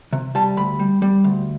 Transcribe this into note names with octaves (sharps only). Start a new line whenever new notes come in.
C3
G3 A5
D2 B5
G3
G3
D2